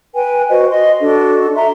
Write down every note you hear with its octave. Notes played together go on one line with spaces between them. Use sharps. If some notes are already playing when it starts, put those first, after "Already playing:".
B4 G5 G#5
F#4 B4 C5 D#5
D#5 C6
D4 F#4 A4
E5 A#5 C6